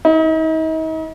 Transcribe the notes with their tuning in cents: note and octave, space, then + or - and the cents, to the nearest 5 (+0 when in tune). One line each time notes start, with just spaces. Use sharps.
D#4 +40